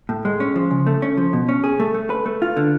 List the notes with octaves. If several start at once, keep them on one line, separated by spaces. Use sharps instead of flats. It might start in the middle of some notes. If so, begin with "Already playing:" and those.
A2
G#3
C#4
F3
C#3
A3
C#4
F3
B2
C#4
G#4
A3
A3
B4
A3
F4
D3